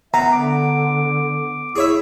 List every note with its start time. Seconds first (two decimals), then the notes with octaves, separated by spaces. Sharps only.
0.14 B3 E5 A#5
0.33 D3 D6
1.76 E4 G#4 C#5 E5